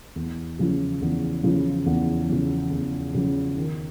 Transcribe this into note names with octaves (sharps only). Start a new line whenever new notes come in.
E2
C#3 F3
E2
C#3 F3
E2
C#3 F3
E2
C#3 F3
D#3